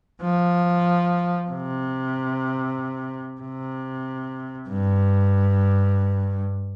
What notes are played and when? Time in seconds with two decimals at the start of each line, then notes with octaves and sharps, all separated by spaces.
0.22 F3
1.50 C3
3.41 C3
4.69 G2